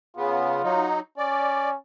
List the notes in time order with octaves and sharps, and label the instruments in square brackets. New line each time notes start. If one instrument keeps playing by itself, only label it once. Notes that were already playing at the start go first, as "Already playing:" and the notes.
[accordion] C#3 B3 [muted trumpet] F4
[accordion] F#3 D#4
[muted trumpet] C#4 [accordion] D5